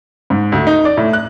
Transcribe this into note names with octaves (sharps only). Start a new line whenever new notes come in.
G#2
D2
D#4
D5
A2
F#6